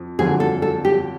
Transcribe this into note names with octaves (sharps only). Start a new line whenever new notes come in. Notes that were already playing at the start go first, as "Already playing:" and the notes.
Already playing: F2
F2 D3 F#3 G#4
A4
A4
G4